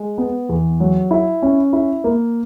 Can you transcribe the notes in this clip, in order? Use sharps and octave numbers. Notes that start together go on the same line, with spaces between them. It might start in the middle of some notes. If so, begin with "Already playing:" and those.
Already playing: G#3
B3
E2
F#3
E4
C#4
E4
A#3